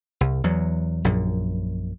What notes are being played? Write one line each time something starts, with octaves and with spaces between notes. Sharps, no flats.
C2
E2 F#3
A#1 F#2